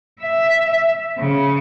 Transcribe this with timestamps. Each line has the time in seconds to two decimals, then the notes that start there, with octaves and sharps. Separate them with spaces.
0.21 E5
1.18 C#3